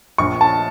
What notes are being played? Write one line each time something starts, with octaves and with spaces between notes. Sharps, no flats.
A#1 C#6
A5